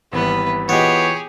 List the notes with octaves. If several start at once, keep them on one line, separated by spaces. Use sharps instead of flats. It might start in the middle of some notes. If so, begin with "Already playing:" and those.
G#1 E3 G3 B3 B4
E3 B3 F4 G4 G#4 C#5 D#5